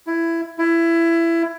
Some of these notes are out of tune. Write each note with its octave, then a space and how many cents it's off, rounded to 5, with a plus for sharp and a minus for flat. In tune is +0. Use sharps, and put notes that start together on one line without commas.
E4 +15
E4 +20